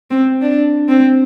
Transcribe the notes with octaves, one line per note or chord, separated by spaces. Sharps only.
C4
D4
C4